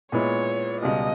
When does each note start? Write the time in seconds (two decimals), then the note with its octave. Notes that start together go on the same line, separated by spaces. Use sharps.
0.12 A#2 G#3 B3 E4 C#5
0.81 C#2 B2 G3 D#5